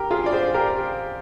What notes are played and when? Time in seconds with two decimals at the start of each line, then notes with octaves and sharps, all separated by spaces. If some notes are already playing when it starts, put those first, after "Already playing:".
Already playing: G4 A#4
0.11 F4 G#4
0.26 D5
0.32 G#4 C5
0.54 G4 A#4